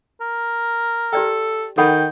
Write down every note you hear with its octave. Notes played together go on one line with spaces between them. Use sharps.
A#4
G4 A4 D5 G5
D#3 A4 F#5 G5 B5